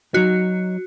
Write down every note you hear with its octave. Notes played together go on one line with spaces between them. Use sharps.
F#3 D#4 F#4